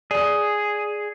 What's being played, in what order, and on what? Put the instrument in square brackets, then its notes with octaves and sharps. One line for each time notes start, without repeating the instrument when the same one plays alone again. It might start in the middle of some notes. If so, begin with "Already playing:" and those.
[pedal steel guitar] G#4 [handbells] D5